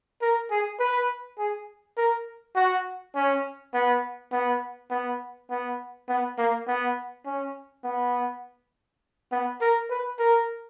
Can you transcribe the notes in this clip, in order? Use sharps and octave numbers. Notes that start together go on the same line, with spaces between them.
A#4
G#4
B4
G#4
A#4
F#4
C#4
B3
B3
B3
B3
B3
A#3
B3
C#4
B3
B3
A#4
B4
A#4